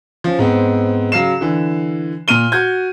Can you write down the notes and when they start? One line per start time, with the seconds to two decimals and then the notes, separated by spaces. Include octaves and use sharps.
0.24 F3 C#4
0.39 G#2 B3 C4
1.12 C#3 F#3 F5 C7 E7
1.41 D3 E3
2.28 A#2 F6 D#7 G7
2.52 F#4 G6 G#6